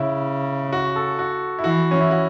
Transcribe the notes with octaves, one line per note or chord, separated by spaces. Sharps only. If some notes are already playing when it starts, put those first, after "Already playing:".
Already playing: C#3 E4
F#4
A4
F#4
E4
E3 F#4
C#4
E4
F#4